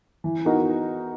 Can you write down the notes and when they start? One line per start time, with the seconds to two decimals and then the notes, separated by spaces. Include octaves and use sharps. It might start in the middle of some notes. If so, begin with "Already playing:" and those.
0.24 E3
0.45 B3 D#4 F#4 A#4